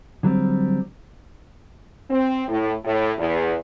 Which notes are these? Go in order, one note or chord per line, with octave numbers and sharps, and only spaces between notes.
D3 F#3 G3 C4
C4
A2
A2
E2